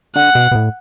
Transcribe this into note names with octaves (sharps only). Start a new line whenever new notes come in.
D3 F#5
B2
B2
A2